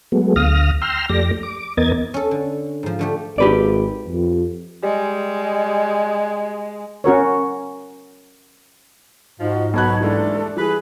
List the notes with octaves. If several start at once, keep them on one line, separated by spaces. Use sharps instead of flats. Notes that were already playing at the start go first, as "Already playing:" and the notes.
F#3 G#3 A3 B3
D2 F5 D#6 F6 A#6
G5 A#5 C6 E6 F6
F2 A3 G4 D5 A#6
D6
E2 B3 A#4 D#5 G#6 A6
C#4 A4
D3
G#2 F3
D3 A3 G4
G#1 G4 B4 D5
F2
G3 G#3
C#4 F#4 A#4 C#5
G#2 F3 F#4 D#5
B1 B2 F#4 C#5 A5 B5 F#6
D#2 E3 G#3 A3 D4 A4
E3 G3 G#4 B4